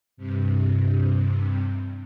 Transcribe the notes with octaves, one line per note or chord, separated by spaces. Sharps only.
G2 C3